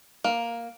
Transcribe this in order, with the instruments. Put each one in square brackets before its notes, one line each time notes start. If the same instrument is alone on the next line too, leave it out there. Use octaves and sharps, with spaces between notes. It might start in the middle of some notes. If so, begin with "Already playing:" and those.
[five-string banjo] A#3